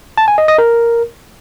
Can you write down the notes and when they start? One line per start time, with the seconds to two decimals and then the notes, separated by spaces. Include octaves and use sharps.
0.18 A5
0.28 G#5
0.38 D#5
0.48 D#5
0.58 A#4